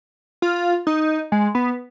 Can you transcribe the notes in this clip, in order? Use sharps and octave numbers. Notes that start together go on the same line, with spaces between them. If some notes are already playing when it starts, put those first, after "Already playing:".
F4
D#4
G#3
B3